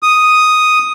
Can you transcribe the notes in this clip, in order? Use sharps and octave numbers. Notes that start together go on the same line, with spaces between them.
D#6